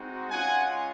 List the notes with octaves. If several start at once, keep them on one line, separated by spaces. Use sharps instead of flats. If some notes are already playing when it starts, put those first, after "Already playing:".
Already playing: G#3 C4 D#4 F#4
G#3 C#4 F4 F#5 G#5